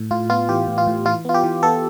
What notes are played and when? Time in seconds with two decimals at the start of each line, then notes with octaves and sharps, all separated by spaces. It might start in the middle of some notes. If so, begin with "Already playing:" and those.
Already playing: A2
0.11 A2 F4
0.30 B3 F4
0.49 E3 G4
0.68 A2
0.78 F4
0.87 A2
1.06 E3 F4
1.25 B3 F4
1.34 G4
1.44 E3
1.63 B3 A4